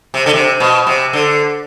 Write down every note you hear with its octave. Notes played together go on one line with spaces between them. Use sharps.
C3
D3
C3
B2
C3
D3